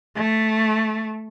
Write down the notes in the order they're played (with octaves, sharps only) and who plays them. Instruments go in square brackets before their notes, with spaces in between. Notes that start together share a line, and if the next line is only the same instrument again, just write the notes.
[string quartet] A3